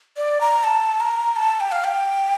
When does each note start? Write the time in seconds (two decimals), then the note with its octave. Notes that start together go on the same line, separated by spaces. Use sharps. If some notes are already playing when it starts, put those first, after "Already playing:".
0.17 D5
0.41 A#5
0.64 A5
1.00 A#5
1.36 A5
1.60 G5
1.72 F5
1.84 G5